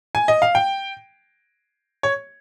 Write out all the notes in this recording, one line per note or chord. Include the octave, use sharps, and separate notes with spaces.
G#5
D#5
F5
G5
C#5